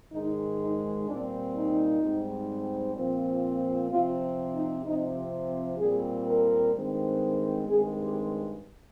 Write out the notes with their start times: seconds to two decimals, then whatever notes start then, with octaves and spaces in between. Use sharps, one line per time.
0.12 G#2 D#3 G#3 D#4
0.60 D#4
1.06 A#2 G3 C4 D4
1.54 D#4
2.01 G#2 G3 C4
2.96 A#2 F3 C4
3.90 C3 F3 C4 F4
4.53 D#4
4.85 C3 F3 C4 D#4
5.79 A#2 G3 C4 G#4
6.26 A#4
6.74 G2 D#3 G#3 C4
7.68 G2 D#3 G#3 C4 G#4
8.00 G4